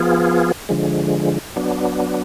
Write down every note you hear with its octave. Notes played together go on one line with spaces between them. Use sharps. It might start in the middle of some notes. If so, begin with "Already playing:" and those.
Already playing: F3 B3 F4 G#4
D3 F3 G#3
F#3 B3 D4